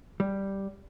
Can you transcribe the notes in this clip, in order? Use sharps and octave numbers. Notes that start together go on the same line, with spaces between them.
G3